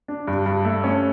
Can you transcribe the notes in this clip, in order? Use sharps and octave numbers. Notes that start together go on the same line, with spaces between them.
D4
G2
G2
A3
C#4